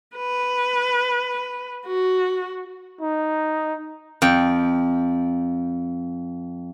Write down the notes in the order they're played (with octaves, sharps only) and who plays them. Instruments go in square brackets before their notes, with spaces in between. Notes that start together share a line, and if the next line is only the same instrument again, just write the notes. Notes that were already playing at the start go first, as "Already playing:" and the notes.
[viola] B4
F#4
[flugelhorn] D#4
[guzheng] F2 G5